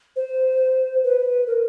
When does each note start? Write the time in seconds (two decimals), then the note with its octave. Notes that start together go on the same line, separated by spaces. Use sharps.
0.16 C5
1.04 B4
1.47 A#4